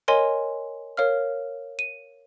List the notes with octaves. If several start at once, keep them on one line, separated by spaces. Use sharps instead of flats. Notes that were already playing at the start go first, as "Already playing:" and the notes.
A#4 C#5 D#5 G#5 C6
A#4 C#5 F5 F6
D#7